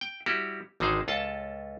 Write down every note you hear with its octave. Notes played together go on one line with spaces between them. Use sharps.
G5
G3 E4 F#4 G4
G#1 D3 D#3 D#4 G#4 C5
C#2 F4 A4 A5